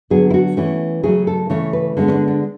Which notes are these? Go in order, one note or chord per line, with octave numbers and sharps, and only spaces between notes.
D3 F#3 B3 G#4
E4
F#4
E3 A3 C#4
C#3 F#3 A3 G#4
A4
C#3 E3 A3 C#4 C#5
B4
D3 G#3 B3 C#4
C#4
D4
D4